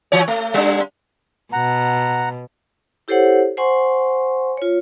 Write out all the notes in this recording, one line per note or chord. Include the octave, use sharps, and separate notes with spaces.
E3 C#5
A3
G3 D4
B2 F#5 A#5
E4 G4 A4 C5 C#5 F#5
C5 F#5 G#5 C6 C#6
F4 C#5